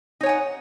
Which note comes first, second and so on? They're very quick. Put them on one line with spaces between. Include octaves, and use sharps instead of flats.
D#4 C#5 G#5 F#5